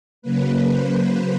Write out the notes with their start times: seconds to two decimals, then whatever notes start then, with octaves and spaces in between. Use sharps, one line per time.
0.22 C#3 F#3 A#3 B4
0.68 C5